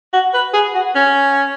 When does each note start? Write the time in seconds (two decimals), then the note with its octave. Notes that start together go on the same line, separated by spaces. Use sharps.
0.13 F#4
0.34 B4
0.54 G#4
0.75 F#4
0.95 C#4